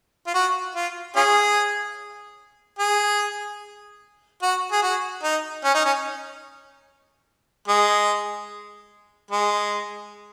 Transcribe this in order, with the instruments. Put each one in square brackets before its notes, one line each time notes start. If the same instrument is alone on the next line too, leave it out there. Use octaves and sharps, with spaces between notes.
[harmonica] F4
F#4
F4
C#4 F4 G#4
G#4
F#4
G#4
F#4
D#4
C#4
D#4
C#4
G#3
G#3